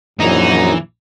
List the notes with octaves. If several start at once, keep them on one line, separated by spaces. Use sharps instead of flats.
A#1 F#2 E3 D#4